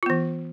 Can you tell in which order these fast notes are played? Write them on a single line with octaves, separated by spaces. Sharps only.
F4 B3 E3